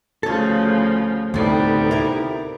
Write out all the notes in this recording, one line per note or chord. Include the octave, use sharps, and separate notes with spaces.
D2 C#3 F3 A4 C#5
D2 A2 C3 G3 B3 D#4 A4 C5
E4 A#4